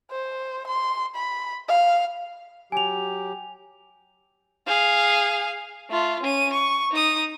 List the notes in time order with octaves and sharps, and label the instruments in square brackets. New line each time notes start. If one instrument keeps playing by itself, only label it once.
[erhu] C5
C6
B5
F5
[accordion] F#3 G4 [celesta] G#5 F7
[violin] G#4 F5
A3 F4
C#4 D#7
C#6
D#4 D#6